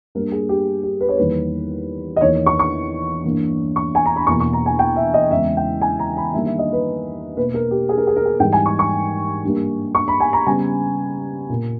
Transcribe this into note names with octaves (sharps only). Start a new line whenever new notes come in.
G2 G3 A#3 A#4
G#4
G4
G4
B4
C#5
E2 D#3 G3 A#3 B4
D#5
E2 D#3 A#3 C#5
C#6
C#6
G2 E3 A#3
C#6
G#5
A#5
B5
E2 B2 A#3 C#6
C#6
A#5
G#5
G5
E5
D#5
E2 C#3 E3 G#3 B3 E5
G5
G#5
A#5
B5
G2 D#3 G3 A#3 E5
E5
D#5
B4
B2 A#3 B4
A#4
G4
G#4
A#4
G#4
A#4
G#4
G#2 E3 G3 G5
G#5
C#6
C#6
G2 G3 A#3
C#6
B5
G#5
A#5
C#3 G3 B3 G#5
A#2 A#3